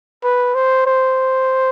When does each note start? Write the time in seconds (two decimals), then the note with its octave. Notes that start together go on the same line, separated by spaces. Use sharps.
0.23 B4
0.55 C5
0.86 C5